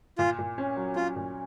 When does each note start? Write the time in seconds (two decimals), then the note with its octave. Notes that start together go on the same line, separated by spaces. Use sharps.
0.18 A#2 F4
0.38 A#2
0.58 C#4
0.77 F#3
0.96 C#4 F4
1.16 A#2